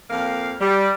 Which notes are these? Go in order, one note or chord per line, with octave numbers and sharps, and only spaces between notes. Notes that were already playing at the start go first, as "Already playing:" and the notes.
F2 A#3 F5
G3